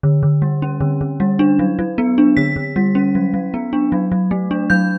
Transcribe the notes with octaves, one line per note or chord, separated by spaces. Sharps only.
D3
D3
G3
C#4
D3
D3
G3
D4
F#3
F#3
B3
D4
D3 B6
D3
G3
C#4
F#3
F#3
B3
D4
F#3
F#3
A3
D4
F#3 G6